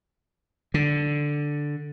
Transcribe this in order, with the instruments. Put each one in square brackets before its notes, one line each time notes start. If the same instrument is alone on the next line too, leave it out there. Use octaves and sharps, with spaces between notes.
[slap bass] D3